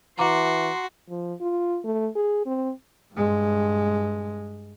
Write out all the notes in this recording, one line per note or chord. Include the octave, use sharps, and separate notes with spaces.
E3 F#4 A#5 C6 D6
F3
F4
A3
G#4
C4
G2 G#3